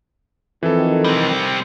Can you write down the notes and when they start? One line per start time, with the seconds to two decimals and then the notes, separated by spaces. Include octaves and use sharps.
0.63 F2 D#3 E3 E4 A4
1.04 G3 C4